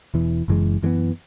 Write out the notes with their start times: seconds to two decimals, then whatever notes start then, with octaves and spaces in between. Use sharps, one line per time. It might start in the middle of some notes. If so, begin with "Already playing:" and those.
0.14 E1 E2 E3
0.48 F#1 F#2 E3 G#3
0.82 F#2 E3 G#3 B3